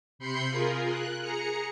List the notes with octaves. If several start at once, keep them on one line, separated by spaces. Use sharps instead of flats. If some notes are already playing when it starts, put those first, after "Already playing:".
C3 B5 C6 G6 C7 C#7
F4 G#4 A#4
F#6
G#4 A#5 C#7